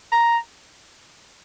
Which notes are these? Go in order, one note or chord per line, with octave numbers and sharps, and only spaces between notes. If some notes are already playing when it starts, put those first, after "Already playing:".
A#5